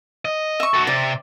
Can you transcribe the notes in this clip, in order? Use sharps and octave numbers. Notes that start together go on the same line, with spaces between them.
D#5
E5 C#6
F#4 A4
C3 D5